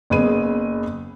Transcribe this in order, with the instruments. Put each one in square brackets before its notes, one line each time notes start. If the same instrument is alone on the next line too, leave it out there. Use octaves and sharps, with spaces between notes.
[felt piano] F#1 B3 G#4 D#7